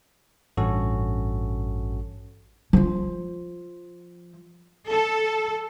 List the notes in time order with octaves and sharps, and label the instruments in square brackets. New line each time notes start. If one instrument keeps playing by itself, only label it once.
[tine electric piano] A1 G2 C#4 F#4 A4
[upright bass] F3 F4
[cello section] A4